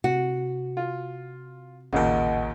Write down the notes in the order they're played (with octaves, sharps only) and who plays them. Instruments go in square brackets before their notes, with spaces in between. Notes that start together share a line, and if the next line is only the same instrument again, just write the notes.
[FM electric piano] C3 [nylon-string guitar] F#4
[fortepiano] F4
[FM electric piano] A1 A#4 [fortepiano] D#2 A#2 C#3 [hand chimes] D#5 F#5